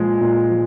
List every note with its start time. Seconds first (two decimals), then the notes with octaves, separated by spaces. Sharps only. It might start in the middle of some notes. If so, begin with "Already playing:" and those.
Already playing: A#2 F3 G#3
0.21 A#2
0.50 F3